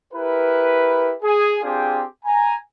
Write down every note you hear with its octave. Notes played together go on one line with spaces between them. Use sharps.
E4 G4 A#4 B4
G#4
C4 D4 F4 G4 G#4 G5
G#5 A#5